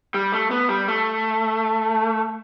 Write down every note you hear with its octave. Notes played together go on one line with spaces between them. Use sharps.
G3
A3
B3
G3
A3